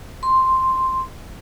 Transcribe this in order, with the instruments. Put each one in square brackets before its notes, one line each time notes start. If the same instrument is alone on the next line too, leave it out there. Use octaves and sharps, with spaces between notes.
[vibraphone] C6